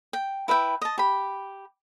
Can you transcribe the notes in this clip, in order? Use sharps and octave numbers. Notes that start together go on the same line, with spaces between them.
G5
E4 B4 E5 G5
D#5 A5
G4 B5